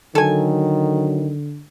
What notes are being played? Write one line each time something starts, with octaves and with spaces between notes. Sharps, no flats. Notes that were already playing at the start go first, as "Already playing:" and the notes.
D3 D#3 F#3 A4 G#5